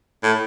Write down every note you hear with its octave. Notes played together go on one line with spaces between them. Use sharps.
A2